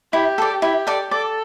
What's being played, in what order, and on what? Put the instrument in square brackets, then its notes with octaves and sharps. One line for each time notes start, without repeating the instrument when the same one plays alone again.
[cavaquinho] E4 [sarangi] G4
[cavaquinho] A4 D5
[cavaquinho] E4 [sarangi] G4
[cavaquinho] A4 D5
[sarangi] A4 [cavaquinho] D5